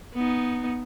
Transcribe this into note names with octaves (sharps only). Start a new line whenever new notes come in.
B3 D#4